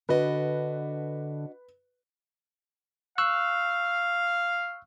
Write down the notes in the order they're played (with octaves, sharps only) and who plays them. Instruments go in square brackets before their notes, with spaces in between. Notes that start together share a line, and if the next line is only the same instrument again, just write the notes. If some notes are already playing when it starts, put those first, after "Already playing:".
[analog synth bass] D3 [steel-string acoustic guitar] D4 F#4 D#5 [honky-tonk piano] B4
[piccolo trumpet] F5 [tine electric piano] C#6 E6 F#6